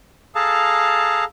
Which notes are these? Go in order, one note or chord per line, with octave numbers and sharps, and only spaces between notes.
G#4 A4 F5 A5 A#5